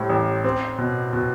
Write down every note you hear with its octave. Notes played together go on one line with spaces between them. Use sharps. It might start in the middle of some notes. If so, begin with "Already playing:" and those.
Already playing: A2 G3 C4
A1
C4
B2
B2